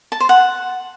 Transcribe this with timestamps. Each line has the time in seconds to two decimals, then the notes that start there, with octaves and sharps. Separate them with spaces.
0.12 A5
0.20 C5
0.29 F#5